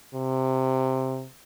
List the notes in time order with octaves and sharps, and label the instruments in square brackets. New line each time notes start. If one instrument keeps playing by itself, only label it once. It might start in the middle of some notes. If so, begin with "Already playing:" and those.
[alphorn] C3